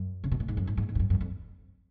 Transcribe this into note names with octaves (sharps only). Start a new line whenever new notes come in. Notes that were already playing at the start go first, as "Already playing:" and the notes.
Already playing: F#2
C#3
B2
A#2
G#2
F#2
G#2
G#2
G#2
F2
F#2
F#2
F2